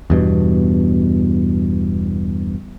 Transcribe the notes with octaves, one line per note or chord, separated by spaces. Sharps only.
E2 G2 B2